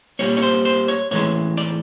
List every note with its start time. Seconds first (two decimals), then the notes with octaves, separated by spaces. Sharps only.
0.19 A#2 G3 A#3 C#5
0.37 C#5
0.42 C5
0.65 C5
0.88 C#5
1.11 A2 E3 G#3 C#5
1.57 D5